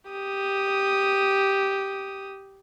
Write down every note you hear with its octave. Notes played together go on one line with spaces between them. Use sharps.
G4 D#6